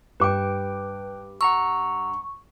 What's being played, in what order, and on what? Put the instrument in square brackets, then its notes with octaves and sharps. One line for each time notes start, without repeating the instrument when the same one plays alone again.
[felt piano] G2 D6 [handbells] B4 G5
[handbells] F#5 A#5 E6 [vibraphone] C#6